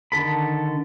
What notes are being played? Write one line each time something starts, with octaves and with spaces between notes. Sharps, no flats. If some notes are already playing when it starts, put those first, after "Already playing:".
D3 D#3 A4 B5